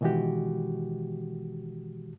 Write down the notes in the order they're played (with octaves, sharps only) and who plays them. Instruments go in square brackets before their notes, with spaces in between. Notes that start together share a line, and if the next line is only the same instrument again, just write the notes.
[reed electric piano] B2 D#3 E3 G#3 F#4 G4